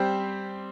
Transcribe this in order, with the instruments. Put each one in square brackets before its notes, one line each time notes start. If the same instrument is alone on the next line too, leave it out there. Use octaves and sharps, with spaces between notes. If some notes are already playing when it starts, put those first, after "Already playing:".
Already playing: [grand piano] G3 C4 G4 C5